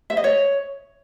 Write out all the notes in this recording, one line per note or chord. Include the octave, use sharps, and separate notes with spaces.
E5
D#5
C#5